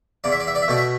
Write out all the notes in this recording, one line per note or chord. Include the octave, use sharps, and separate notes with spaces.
E2 D5
E5
D5
E5
D5
E5
B2 A3 D5
E5